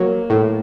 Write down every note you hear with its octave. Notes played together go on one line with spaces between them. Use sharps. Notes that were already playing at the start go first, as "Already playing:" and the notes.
Already playing: F#3 A#3
A2